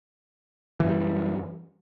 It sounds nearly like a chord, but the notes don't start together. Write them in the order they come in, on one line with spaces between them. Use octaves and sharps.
E3 F#2 G3